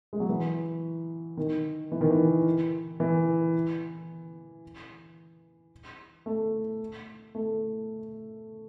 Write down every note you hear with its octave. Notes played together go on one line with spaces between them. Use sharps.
G#3
F#3
E3
D#3
E3
D#3
E3
E3
A3
A3